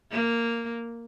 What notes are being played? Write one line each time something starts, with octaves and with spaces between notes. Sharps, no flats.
A#3